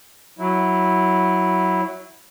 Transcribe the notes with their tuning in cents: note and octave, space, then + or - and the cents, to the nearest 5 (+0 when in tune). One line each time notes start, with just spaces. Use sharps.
F#3 +0 E4 -10